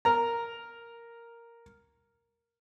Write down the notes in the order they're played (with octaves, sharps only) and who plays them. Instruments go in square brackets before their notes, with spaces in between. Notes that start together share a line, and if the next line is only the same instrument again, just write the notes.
[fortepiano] A#4 A#5